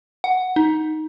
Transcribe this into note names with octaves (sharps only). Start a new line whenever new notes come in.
F#5
D#4